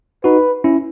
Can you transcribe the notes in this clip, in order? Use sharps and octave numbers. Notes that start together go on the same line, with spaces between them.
D#4 F#4 B4
C#4 E4